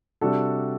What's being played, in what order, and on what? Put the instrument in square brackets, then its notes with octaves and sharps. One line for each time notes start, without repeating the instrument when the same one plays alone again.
[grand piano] C3 G3 D4 F#4 A4